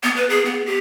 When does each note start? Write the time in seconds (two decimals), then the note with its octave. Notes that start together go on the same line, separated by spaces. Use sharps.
0.03 B3
0.16 B4
0.30 G#4
0.45 B3
0.66 G4